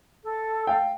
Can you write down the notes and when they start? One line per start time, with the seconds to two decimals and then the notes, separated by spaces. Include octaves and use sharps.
0.23 A4
0.67 F5 G5